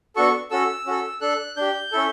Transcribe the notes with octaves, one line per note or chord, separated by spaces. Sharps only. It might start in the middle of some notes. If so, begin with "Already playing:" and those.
B3 D4 F#4 A4 C#6
C#4 F#4 A4 E6
C#4 F#4 A4
D4 A4 F#6
D4 G4 G6
C#4 E4 A4